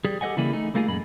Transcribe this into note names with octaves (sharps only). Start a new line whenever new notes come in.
G3 G#4
G4 A4 C5 D#5 F#5 G#5
C#3 E3 G3 A#3 E4 G#4
A3 D#4
G3 A3 A#3 F4 F#4 G#4
F#2 A#2 G#3 B5